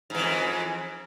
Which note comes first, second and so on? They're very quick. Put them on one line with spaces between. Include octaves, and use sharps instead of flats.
G#2 E3 F2